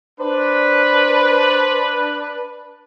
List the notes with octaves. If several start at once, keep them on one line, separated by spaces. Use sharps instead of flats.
D4 B4 C5